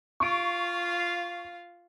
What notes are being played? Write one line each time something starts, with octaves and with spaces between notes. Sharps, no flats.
F4 F5 C#6 D7